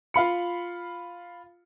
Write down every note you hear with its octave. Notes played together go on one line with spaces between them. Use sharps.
F4 F5 B5 C#7